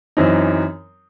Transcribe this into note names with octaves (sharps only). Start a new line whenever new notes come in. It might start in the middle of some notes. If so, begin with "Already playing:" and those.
F#2 E3 C4 D#4